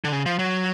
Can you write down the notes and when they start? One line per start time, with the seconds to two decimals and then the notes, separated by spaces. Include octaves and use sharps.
0.04 D3
0.12 C#3
0.26 F3
0.39 F#3